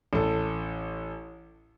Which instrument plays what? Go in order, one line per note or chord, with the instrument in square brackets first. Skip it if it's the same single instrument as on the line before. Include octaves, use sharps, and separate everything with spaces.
[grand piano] A1 A4